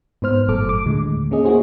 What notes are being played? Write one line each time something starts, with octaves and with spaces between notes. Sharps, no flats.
G#2 B3 C5 F6
G1 A2 F#3 A3 A4 D6
D6
D#2 A2 D3 G#3
A#3 C#4 G#4 D#5
A#3 E4 F#4 G#4 C5